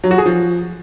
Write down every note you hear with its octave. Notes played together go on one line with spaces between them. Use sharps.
F#3
F#4
G#4
F3